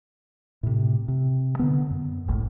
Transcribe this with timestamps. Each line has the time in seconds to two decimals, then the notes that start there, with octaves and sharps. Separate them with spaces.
0.63 A2 C3
1.08 C3
1.59 D3 B3
1.91 F#2
2.28 F#1 C#2 A2